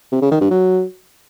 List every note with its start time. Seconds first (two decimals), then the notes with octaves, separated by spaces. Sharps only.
0.12 C3
0.21 C#3
0.31 D#3
0.41 G2
0.51 F#3